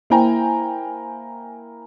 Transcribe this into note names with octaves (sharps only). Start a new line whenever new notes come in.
A#3 E4 C5 G5 G#5 A#5